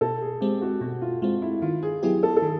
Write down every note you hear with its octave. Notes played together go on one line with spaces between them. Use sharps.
B2 A4
G#4
G#3 C4 G4
F#4
B2 F#4
F4
G#3 C4 F4
E4
D#3 F4
G#4
F#3 B3 E4 G4 G#4
A4
A4
D#3 G#4